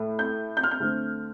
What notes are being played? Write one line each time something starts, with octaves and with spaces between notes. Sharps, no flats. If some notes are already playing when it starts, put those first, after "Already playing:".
Already playing: A2 A3
G6
G6
F6
G6
D3 A3 C4